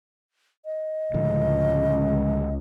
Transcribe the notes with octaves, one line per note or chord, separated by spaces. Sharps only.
D#5
C#2 A2 D3 F3